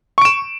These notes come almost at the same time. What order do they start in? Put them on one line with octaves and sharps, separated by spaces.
C#6 D7 E7